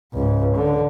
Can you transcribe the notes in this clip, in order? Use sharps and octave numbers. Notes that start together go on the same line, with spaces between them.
C#2 G#2
D3